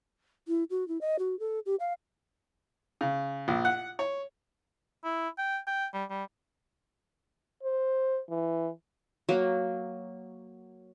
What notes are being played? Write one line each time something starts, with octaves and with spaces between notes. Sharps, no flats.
E4
F#4
E4
D#5
F#4
A4
G4
F5
C#3
A#1
F#5
C#5
E4
G5
G5
G3
G3
C5
E3
F#3 A#3